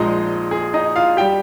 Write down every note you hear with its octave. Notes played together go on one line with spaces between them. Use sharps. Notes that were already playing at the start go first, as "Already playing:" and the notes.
Already playing: A#1 A#2 F3 G#3 D#4 D#5
G#4
D#4 D#5
F4 F5
G3 G4 G5